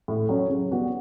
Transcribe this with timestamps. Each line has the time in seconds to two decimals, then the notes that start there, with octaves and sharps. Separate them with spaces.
0.08 A2
0.29 F#3 C#4 F#4
0.49 C#3
0.70 G3 B3 F#4